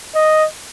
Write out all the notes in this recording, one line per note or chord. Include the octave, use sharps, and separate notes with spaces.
D#5